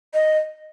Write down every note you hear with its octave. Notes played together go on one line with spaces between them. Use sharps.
D#5